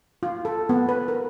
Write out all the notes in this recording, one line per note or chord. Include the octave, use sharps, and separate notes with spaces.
F4
A4
B3
B4
A#4